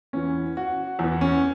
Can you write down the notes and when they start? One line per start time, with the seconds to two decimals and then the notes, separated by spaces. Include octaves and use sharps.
0.13 E2 E3 C#4
0.57 F#4
0.99 E2 E3
1.21 C#4